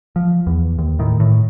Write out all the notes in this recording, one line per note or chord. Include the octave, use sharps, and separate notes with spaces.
F3
E2
D#2
A2 D#3
A2